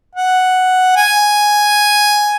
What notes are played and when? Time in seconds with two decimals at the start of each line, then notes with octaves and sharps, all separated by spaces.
0.15 F#5
0.96 G#5